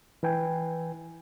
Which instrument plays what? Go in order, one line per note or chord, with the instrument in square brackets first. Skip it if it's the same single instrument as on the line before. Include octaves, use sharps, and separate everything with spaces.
[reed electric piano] E3 B4 G5 G#5